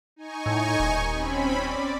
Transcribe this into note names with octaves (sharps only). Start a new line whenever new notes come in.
D#4 G#5 C#6
A2
D#1
C4 C#4 B5
D5